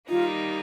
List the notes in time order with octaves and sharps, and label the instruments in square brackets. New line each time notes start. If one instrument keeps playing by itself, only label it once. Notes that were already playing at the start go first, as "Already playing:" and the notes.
[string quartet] D#3 G3 A#3 D#4 [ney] F4